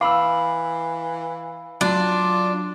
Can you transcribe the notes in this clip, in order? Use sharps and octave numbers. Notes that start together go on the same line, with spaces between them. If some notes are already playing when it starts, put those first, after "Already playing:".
E3 F5 B5 D6 E6
F#3 D4 F4